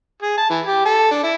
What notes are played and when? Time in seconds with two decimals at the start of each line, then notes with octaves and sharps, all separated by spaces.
0.22 G#4
0.38 A5
0.50 E3
0.65 G4
0.85 A4
1.11 D4
1.24 E4